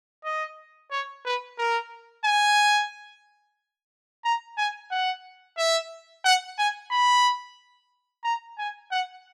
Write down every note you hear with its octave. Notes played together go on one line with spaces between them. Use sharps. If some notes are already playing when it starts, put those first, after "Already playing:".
D#5
C#5
B4
A#4
G#5
A#5
G#5
F#5
E5
F#5
G#5
B5
A#5
G#5
F#5